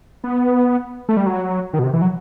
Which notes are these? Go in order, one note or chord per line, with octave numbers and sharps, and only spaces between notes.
B3
A3
G3
F#3
D#3
B2
C3
E3
F#3